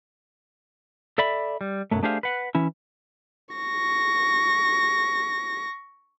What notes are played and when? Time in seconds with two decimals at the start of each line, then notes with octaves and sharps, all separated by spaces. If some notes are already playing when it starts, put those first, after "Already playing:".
1.18 A4 D5 E5 B5
1.61 G3
1.91 B1 F#2 F#3 A3
2.03 A3 D4 G4 G#4 C5 F5
2.23 B4 F#5
2.55 E3 C#4 E4
3.55 C#6 A#6